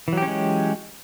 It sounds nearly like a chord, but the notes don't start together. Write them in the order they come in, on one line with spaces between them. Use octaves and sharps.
E3 F#3 G4 C#4 G#3